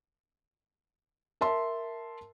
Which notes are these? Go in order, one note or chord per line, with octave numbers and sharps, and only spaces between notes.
A#4 E5 A5 C6